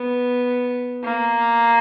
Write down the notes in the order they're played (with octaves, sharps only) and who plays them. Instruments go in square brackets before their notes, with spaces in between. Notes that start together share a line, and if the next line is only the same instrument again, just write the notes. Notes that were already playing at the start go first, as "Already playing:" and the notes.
Already playing: [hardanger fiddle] B3
A#3